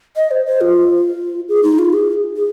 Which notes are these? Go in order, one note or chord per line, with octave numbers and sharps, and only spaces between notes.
D#5
C5
C5
F4
G#4
D#4
F4
G#4
G#4